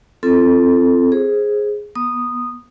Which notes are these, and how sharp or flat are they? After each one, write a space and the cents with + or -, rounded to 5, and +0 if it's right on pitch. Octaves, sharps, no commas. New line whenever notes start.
C4 +0 F4 -35 A4 +0
G#4 +0 C5 +20
B3 -30 D#6 -10